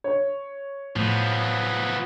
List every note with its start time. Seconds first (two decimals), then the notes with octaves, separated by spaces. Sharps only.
0.04 C#5
0.96 A2 F3 B3